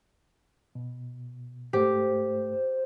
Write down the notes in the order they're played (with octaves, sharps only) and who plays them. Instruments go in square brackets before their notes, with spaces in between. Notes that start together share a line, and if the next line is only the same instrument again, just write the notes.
[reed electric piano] B2
[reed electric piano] G#2 A3 [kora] G4 [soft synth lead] C5